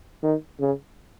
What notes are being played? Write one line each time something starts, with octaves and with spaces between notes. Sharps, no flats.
D#3
C#3